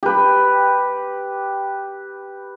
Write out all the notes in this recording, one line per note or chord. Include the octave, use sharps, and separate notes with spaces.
G4 B4